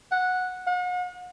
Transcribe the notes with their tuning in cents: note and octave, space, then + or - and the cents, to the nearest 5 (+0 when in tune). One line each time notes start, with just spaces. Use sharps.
F#5 -10
F#5 -40